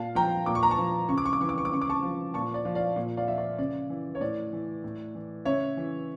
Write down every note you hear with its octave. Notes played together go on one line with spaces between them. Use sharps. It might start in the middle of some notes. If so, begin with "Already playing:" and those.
Already playing: A#2 F5 A5
F3 G5 A#5
A#2 D6
C#6
A#5
A5 C#6
F3
C#3 C#6
D6
C#6
D6
E3 C#6
D6
C#6
D6
C#3 C#6
D6
A5 C#6
F3
A#2 A5 C#6
D5
F3
D5 F5
A#2
D5 F5
F3 E5
D5
C#3 D5
E3
C#5
A2 D5
E3
A2
E3
C#3 C#5 E5
E3